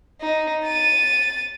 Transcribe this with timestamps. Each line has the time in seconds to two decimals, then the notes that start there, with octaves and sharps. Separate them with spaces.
0.21 D#4
0.66 A6 D#7